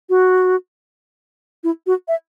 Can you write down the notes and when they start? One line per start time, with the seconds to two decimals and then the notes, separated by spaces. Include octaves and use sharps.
0.09 F#4
1.64 E4
1.87 F#4
2.08 E5